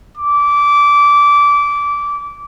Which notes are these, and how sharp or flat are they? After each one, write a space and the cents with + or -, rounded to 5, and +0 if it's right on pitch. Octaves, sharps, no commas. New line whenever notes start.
D6 -20